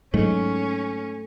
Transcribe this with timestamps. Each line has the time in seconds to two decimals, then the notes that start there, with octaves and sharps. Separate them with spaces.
0.14 G#2 F#3 G#3 A3 C#4